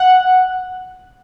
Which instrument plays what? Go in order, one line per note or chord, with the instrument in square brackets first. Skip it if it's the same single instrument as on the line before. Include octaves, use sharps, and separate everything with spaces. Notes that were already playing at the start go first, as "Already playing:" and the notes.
Already playing: [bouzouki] F#5